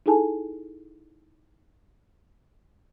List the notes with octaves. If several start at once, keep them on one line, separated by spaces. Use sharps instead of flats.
D#4 E4 G#4 A4 G#5 A5